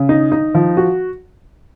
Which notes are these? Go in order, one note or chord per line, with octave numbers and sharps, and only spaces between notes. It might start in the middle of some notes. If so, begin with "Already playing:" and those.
Already playing: C#3
D#4
D#4
F3
F#4